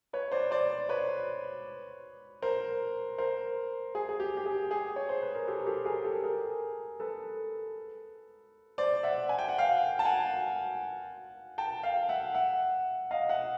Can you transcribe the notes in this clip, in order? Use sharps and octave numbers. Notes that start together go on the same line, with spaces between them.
B4 C#5
C5 D5
C5 D5
B4 C#5
A#4 C5
A#4 C5
G#4
G#4
G4
G4
G#4
G#4
C#5
C5
B4
A#4
G4 A4
A#4
G4 A4
G#4 A#4
G4 A4
G#4 A#4
A4 B4
C5 D5
E5 F#5
G#5
G5
F#5
F5 G5
A5
F#5 G#5
G5 A5
F5 G5
E5 F#5
E5 F#5
D#5 F5
E5 F#5